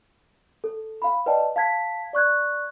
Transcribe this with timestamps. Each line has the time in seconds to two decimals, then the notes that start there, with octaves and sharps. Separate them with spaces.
0.64 A4
1.02 F5 B5
1.26 B4 D5 D#5 G5 A5
1.56 F5 A5 G#6 B6
2.13 D5 C#6 F#6 G#6